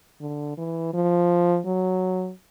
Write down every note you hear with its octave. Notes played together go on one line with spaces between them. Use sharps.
D3
E3
F3
F#3